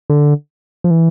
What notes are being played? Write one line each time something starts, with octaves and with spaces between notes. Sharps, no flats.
D3
F3
E3